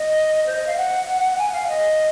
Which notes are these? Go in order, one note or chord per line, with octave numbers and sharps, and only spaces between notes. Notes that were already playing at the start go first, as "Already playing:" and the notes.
Already playing: D#5
C5
D#5
F5
F#5
G#5
F5
D#5